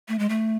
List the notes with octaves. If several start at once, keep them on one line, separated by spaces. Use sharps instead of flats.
A3
G#3
A3